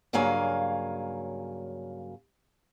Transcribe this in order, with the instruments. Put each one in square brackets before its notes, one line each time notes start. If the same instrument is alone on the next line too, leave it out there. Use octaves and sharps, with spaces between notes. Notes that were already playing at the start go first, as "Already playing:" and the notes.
[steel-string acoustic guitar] G2 C#3 F#3 A#3 F5 G#5